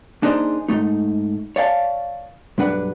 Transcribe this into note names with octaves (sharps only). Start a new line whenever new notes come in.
A#3 D4 D#4 G#4 C5
G#2 B2 A3 D#4
C#5 D5 F5 G5 A5
B1 G2 D4 B4 F#5